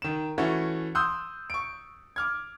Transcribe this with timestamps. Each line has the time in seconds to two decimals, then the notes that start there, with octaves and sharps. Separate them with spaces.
0.02 D#3 E7
0.38 E3 A3 C#4 F#4
0.95 C6 D#6 E6 F#6 G6
1.50 C#6 D7
2.16 D6 F6 G#6